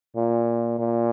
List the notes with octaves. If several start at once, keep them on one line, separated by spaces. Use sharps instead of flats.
A#2
A#2